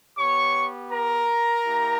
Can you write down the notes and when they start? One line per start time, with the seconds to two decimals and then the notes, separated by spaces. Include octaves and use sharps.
0.18 B3 G4 C#5 C#6
0.91 A#4 A#5
1.65 A#3 E4 G4